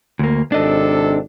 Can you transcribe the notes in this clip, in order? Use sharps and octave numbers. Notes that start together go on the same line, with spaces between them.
D2 A#3
G#1 C3 D4 A4 D#5